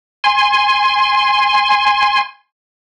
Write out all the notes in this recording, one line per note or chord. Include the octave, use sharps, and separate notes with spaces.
G#5 C6